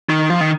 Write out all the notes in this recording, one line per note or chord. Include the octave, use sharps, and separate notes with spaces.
D#3
F3
D#3